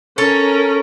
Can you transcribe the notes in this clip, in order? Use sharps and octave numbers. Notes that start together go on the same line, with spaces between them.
C#4 A4 A#4 C#5